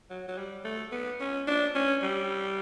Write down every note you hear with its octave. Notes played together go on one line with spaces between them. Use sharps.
F#3
F#3
G3
A3
B3
C#4
D4
C#4
G3